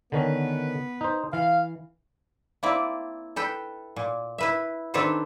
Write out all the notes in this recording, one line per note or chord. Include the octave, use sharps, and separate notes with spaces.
D3 D#3 B3 C#4 B4
D#4 C5
E3 F5
A#3 C4 E4 D5
A4 B4 G5
A#2
E4 B4 E5
D#3 C4 D4 A4 B4 C5